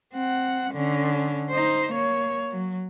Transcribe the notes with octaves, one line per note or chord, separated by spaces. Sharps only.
C4 F#5
D3 C#4
D#4 C5
A#3 C#5
F#3